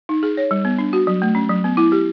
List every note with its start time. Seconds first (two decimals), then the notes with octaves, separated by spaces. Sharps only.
0.09 D#4
0.23 G#4
0.37 C#5
0.51 G3
0.65 B3
0.78 D4
0.93 F#4
1.07 F#3
1.22 A3
1.35 C#4
1.49 F#3
1.64 B3
1.77 E4
1.92 G4